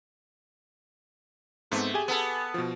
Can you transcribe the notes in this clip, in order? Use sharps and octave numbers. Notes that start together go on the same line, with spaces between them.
G#2 A3 B3 C4
G4 G#4 G#5
B3 A4
B2 F3